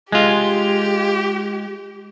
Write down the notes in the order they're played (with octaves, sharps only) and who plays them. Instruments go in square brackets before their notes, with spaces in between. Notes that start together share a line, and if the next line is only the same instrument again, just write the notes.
[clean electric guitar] G#3 F4 [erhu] G4